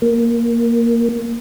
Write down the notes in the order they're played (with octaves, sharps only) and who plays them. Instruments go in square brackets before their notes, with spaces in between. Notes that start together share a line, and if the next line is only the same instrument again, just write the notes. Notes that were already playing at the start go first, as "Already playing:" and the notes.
[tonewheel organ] A#3